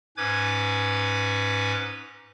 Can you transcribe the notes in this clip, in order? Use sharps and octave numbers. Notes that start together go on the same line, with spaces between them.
G#2 C#4 B4 D6 G#6